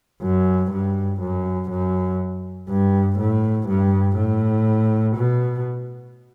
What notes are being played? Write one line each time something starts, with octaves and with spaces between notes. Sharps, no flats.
F#2
G2
F#2
F#2
G2
A2
G2
A2
B2